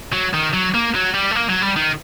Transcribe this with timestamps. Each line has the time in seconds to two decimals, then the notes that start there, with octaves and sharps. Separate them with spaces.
0.12 F#3
0.33 D#3
0.53 F#3
0.74 A#3
0.95 F#3
1.14 G3
1.31 A3
1.35 A#3
1.49 F#3
1.62 G3
1.76 D#3